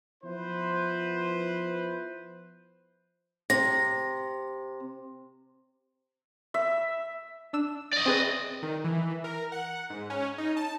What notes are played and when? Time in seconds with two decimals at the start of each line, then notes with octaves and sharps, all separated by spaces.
0.23 F3 B3 E4 B4 C5
3.50 C3 A#6
6.54 E5
7.53 D4 E6 E7
7.94 D5 D#5
8.06 C4 G#4 B4
8.62 D#3
8.84 E3
9.24 A#4
9.52 F#5
9.90 G#2
10.10 C#4
10.38 D#4
10.57 A5